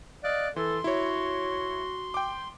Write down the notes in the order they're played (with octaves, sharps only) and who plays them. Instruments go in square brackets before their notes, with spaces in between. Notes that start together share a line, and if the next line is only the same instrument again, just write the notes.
[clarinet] D5 [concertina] D#5 F5 F#6
[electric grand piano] E3 [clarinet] A4 [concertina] C6
[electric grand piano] E4 C#5 [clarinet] F#4
[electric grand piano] G5 D6